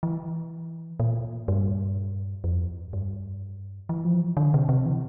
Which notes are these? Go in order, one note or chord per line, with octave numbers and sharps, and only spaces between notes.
E3
A#2
G2
F2
G2
E3
F3
E3
D3
C3
C3
E3